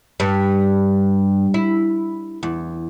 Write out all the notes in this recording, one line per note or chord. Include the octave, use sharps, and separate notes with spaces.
G2
E4
E2